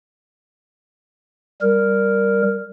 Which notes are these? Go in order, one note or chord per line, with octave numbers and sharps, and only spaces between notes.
G3 A#4